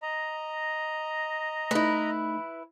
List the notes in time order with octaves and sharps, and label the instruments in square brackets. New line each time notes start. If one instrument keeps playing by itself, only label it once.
[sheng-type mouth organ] D#5 A#5
[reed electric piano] A3 D#4 [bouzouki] E4 B4